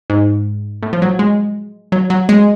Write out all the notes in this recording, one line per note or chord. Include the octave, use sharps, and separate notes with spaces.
G#2
A2
F3
F#3
G#3
F#3
F#3
G#3